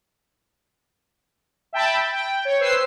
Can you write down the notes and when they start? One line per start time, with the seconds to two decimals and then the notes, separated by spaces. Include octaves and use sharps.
1.73 E5 G5 A5 B5
2.13 G5
2.45 C#5
2.59 B4 C5 E6 C7